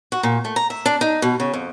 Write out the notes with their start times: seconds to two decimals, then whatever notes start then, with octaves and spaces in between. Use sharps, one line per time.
0.12 F#4
0.23 A#2
0.45 A3
0.56 A#5
0.70 E5
0.86 D4
1.01 D#4
1.22 B2
1.40 C#3
1.54 F2